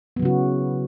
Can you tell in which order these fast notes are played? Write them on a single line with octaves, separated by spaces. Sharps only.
B3 F#3 C#3 F#4 E4